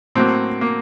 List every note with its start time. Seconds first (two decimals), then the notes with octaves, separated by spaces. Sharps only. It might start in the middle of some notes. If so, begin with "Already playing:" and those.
0.15 A2 F#3 A#3 C4
0.61 A#3